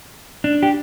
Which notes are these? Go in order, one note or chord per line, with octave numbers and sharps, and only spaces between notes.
D4
G4